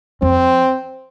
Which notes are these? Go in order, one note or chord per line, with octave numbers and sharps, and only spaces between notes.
F2 C4